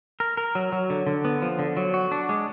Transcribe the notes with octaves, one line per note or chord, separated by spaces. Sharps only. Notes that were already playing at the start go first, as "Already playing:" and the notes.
A#4
A#4
F#3
F#3
D3
D3
B3
F3
D3
F#3
F#4
D4
G#3